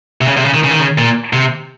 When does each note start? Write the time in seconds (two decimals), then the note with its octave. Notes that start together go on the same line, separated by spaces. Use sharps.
0.21 C3
0.28 C#3
0.37 C3
0.45 C#3
0.54 D#3
0.64 C#3
0.71 D#3
0.80 C#3
0.98 A#2
1.33 C3